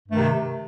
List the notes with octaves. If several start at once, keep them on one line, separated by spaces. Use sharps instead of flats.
G2 C3 D#3 A3